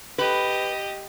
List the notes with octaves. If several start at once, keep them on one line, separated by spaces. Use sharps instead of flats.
G4 B4 D#5